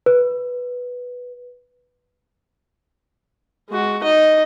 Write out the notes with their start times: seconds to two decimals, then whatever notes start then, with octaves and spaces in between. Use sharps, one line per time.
0.06 B4
3.69 G#3 F#4
4.03 D#4 D#5